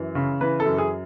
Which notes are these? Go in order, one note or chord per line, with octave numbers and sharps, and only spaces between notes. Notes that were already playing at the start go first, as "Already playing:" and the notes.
Already playing: F#2 E3
C#3
E3 B4
A4
F#2
G#4